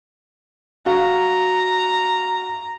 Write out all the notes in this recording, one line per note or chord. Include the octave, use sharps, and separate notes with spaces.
F#4 F5 A#5